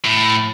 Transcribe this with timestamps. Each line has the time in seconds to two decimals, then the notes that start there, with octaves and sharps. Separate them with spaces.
0.05 A2